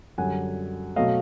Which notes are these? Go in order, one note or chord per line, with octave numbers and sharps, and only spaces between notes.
F#2 D3 G3 F#5 G#5
B2 F#3 A3 D#5 F5